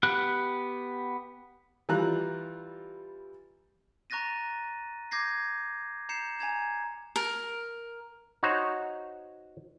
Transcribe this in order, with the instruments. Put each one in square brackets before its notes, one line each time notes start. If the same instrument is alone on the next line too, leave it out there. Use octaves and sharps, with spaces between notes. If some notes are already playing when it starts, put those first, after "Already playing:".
[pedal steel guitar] B3 G4 F#6
[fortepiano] E3 G3 F4 A#5 F#6
[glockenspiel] A#5 C#6 F#6 A6 A#6 D#7
D6 G6 G#6 A#6 C7
A#5 G6 C7 C#7 E7
G#5 A#5 G#6 E7
[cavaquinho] A#4
[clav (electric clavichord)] D#4 F#4 C5 C#5